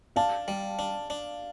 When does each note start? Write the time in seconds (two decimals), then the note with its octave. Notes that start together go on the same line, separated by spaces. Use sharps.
0.16 D4 F5 A5
0.48 G3
0.79 D4
1.10 D4